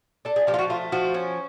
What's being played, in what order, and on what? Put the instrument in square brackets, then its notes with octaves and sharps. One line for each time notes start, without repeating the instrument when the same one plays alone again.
[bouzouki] D4 A4
G#4
F3 G4
F4
F#4
A3 F4
F3 F#4
C#4